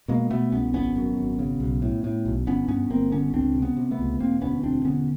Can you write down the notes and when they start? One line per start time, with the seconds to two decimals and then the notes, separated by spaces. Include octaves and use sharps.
0.08 B2 G#3 A#3
0.30 B2 A3 B3
0.52 C2 B3 C#4
0.74 G#1 B3 C#4
0.96 F#2
1.17 G#1
1.39 C#3
1.60 B1
1.82 A2
2.04 A2
2.25 B1
2.47 G1 B3 C#4
2.68 G2 B3 C#4
2.90 G1 A#3 C4
3.11 D3 B3 C#4
3.34 C#2 C4 D4
3.55 C3
3.62 B3 C#4
3.77 C3
3.91 A3 B3
3.99 C#2
4.20 E1 A#3 C4
4.41 D2 B3 C#4
4.63 E1 C4 D4
4.85 D3 B3 C#4